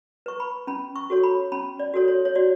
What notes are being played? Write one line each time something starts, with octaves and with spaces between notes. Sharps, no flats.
B4 C#6
B5
C#4 B5
C#6
F#4 A4 C#5
B5
C#4 B5
D5
F#4 A4 C#5
C#5
C#5
F#4 D5